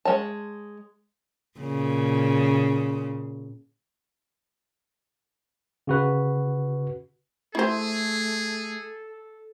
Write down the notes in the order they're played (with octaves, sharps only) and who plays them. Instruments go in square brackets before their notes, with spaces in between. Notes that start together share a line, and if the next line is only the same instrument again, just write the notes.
[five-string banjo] G#3 C#5 A5
[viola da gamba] A#2 C#3
[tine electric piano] C#3 F#4 B4
[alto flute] A3 [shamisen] E4 C5 [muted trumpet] G#4 [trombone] A4